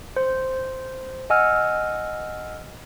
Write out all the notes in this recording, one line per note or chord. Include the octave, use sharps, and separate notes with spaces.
C5
D#5 F#5 G#5 E6 F6